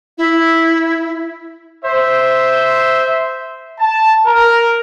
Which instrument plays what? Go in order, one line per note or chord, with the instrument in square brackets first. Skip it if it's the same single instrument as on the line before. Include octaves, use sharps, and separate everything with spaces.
[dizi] E4
[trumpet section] C5 E5
A5
A#4